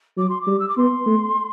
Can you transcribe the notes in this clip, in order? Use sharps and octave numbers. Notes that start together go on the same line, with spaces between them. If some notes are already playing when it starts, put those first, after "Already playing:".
F#3 D6
C6
D6
G3
E6
D6
B3 C6
A3